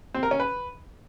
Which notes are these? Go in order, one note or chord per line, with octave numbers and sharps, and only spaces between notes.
C4
A#4
C#4
B4